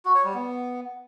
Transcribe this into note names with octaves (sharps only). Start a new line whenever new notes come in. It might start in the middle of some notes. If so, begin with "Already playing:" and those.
F#4
C#5
G3
B3